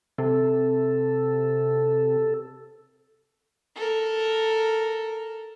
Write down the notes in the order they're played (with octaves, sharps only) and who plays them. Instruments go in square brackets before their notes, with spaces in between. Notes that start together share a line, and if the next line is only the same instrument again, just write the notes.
[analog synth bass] C3 [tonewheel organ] A4
[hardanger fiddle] A4 A#4